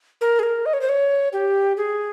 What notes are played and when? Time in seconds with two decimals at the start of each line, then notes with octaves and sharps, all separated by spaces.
0.21 A#4
0.39 G#4
0.43 A#4
0.66 D#5
0.73 C#5
0.81 C5
0.89 C#5
1.33 G4
1.77 G#4